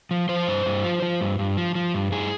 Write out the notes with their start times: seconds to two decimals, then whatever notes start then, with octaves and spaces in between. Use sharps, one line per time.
0.11 F3
0.29 F3 C5
0.47 G2
0.66 G2
0.84 F3
1.02 F3
1.21 G2
1.39 G2
1.57 F3
1.75 F3
1.94 G2
2.12 G2 G#4